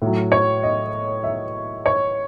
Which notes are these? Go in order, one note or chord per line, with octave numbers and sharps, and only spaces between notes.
A2 F#3
C#5
D#5
E5
C#5